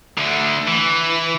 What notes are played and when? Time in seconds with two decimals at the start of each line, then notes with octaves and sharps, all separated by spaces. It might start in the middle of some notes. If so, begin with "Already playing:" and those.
0.18 D2 D3
0.68 E3